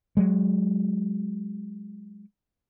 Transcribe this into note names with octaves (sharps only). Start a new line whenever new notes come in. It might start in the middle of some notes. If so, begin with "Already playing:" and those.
F#3 G#3